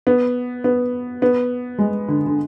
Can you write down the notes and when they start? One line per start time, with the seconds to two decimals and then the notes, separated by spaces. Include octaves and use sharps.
0.07 B3
0.64 B3
1.22 B3
1.79 G#3
2.08 D3
2.26 D3